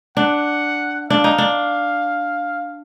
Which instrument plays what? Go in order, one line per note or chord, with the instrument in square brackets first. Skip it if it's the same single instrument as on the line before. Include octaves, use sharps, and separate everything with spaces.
[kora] D4 [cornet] F#5
[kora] D4 [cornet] F5
[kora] D#4
D4